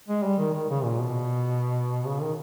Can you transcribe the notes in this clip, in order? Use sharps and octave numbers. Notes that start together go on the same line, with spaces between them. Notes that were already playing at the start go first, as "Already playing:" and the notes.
G#3
G3
D#3
D#3
C#3
A#2
B2
C#3
D#3